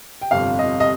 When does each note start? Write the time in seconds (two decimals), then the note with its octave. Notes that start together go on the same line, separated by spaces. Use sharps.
0.21 G5
0.31 G1 F2 C3 F5
0.59 D#5
0.80 D#5